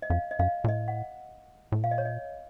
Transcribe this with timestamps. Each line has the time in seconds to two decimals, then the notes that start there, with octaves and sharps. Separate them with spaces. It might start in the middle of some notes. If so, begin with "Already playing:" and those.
0.02 D#5
0.10 F2 F5
0.31 D#5
0.39 F#2 F5
0.64 A#2
0.68 A2 D#5
0.88 F#5
1.72 A2
1.83 A#2 F5
1.91 D#5
1.98 C#5
2.05 D#5